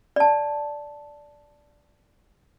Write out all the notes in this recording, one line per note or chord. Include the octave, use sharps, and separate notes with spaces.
D5 A5